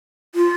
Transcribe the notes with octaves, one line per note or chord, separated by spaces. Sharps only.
F4